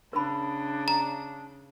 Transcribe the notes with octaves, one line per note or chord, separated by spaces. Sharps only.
C#3 D4 A#4 B5
A#5